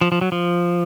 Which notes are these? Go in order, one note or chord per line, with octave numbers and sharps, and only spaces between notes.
F3
F3
F#3
F3